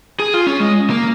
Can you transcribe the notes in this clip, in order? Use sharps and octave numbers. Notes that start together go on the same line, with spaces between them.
G#4
F4
C#4
G#3
A#3